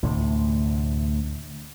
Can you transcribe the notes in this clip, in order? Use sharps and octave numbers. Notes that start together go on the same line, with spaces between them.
D2 A2 C3